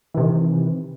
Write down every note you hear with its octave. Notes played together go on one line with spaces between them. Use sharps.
C3 D#3 E3